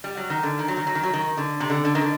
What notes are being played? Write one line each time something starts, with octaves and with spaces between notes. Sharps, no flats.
G3
F#3
D#3
D3
D#3
F#3
D#3
F#3
D#3
F#3
D#3
D3
C3
D3
D3
D#3
D3